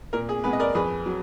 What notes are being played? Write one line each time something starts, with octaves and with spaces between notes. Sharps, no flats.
A#2 A#4
G#4
G#3 B3 G#4 B4
D#5
A#4 D5
F2 G#4 B4
F#3